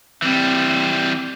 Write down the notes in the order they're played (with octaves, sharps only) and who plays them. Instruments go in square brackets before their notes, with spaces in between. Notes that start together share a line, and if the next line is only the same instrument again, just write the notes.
[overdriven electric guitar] E3 G3 [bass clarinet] C4